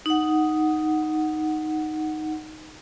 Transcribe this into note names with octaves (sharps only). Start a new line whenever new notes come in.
D#4 F#5